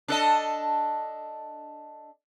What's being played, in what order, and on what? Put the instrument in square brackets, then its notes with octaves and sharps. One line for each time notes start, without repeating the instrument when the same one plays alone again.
[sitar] D4 A4 D#5